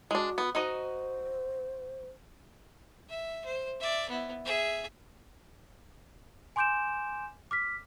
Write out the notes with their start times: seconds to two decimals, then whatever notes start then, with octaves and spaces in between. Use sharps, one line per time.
0.11 G#3 D4 F#4
0.38 B3
0.55 D#4 F#4 C5 D#5
3.09 E5
3.45 C5
3.80 D5 E5
4.09 B3 E4
4.45 G#4 E5
6.56 G#5 C6 D6 G6 D7 E7
7.51 D6 F6 B6